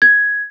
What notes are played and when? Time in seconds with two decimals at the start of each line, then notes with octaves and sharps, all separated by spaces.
0.02 G#6